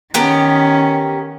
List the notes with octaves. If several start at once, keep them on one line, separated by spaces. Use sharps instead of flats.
D#3 B3 C#4 G4 A#4